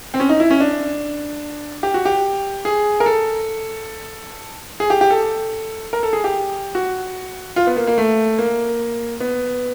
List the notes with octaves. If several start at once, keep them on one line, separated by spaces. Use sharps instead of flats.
C4
C#4
D#4
E4
C#4
D4
G4
F#4
G4
G#4
A#4
A4
G#4
G4
G4
A4
A#4
A4
G#4
G4
F#4
F4
B3
A#3
A#3
A3
A#3
B3